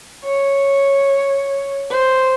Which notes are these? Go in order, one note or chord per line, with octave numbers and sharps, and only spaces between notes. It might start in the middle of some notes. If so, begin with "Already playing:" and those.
C#5
C5